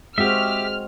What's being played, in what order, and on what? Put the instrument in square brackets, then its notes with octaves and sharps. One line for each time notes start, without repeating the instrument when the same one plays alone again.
[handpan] G#3 C4 F#4 [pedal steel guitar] G4 E5 [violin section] F6